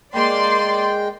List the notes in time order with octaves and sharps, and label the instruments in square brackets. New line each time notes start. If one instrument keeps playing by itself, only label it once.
[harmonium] G#3 G5 [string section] A#3 D5 C6